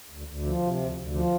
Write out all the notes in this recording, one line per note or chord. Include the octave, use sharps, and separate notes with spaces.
D2
D2
F3
C3
D2
D2
F3